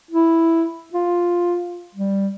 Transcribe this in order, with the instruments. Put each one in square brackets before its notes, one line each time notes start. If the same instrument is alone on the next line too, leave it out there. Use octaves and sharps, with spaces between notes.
[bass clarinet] E4
F4
G3